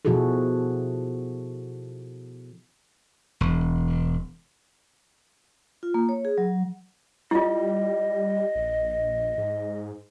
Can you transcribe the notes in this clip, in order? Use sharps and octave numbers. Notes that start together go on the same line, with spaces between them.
B2 F3 E4 F#4 G#4 A4
E1
F4
A#3
C#5
G#4
F#3
G3 E4 F4 D#5
A#1
G#2